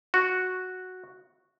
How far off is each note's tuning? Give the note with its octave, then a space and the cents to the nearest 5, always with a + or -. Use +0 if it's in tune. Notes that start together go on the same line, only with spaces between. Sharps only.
F#4 -5